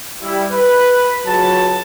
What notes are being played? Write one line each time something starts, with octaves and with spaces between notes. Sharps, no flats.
G3 E4
B4
C#2 F#3 A5